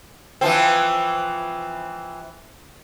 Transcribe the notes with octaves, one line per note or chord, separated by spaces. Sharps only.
E3 F3 C4